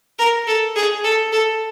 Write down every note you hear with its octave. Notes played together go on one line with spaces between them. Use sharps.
A#4
A4
G#4
A4
A4